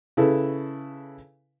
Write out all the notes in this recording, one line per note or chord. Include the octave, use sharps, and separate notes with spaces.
C#3 E4 A4 B4